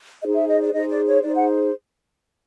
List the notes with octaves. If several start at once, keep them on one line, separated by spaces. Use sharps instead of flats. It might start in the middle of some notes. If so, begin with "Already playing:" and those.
D#4 G#4 C5 D#5
E5
D#5
D5
D#4 G#4 C5 D#5
D5
C#5
D#4 G#4 C5 D5
F#5